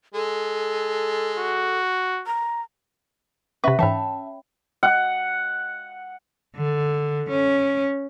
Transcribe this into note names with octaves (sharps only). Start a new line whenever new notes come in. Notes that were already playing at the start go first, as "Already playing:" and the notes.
G#3 A4
F#4
A#5
C3 C#4 B4 E5 C#6
G#2 E3 C#5 E5 G5 A5 B5
F#5
D3
C#4